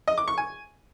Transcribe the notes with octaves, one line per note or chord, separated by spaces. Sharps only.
D#5
D6
C#6
G#5